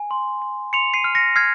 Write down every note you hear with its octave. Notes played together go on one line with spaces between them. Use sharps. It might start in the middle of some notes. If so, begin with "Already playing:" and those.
Already playing: G#5
C6
C6
C6 C#7 F7
C7 D#7
F6
A#6 C#7
F6 G#6 C7